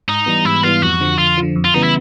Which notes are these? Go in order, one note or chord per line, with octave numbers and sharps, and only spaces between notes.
G#2 D#4
E3 G3 B3
G#2 E4
E3 G3 B3 F4
F2 F#4
D3 F3
F2 F4
D3 F3
F2
F4
C#3 E3 G3 B3 D#4
E4